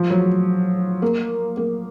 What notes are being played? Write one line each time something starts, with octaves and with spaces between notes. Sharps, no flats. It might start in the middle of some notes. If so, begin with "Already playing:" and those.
Already playing: F3
F#3
A#3
A#3